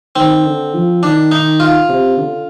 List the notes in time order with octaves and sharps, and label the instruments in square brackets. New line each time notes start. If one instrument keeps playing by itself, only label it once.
[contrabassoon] D#3 [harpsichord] C4
[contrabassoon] D3
F3
[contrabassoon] D#3 [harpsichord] D4
[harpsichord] D#4
F4
[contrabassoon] C3
D3